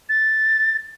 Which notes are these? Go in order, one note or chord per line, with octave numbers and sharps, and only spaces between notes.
A6